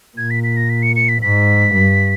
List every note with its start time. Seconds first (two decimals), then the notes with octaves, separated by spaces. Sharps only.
0.17 A#2 G#6
0.31 B6
0.44 B6
0.57 A#6
0.69 B6
0.83 C#7
0.96 C#7
1.09 B6
1.22 G#2 B6
1.74 G2